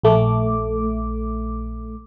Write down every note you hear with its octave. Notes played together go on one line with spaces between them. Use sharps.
A#1 A3 D6